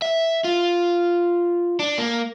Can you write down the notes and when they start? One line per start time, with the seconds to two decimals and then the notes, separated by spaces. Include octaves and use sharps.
0.02 E5
0.44 F4
1.79 D4
1.98 A#3